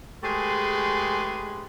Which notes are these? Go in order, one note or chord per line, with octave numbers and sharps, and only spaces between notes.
G#3 A3 G4 G#4 B4 C6